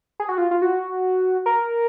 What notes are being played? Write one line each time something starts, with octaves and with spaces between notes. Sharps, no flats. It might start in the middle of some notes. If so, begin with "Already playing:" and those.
G#4
F#4
F4
F4
F#4
A#4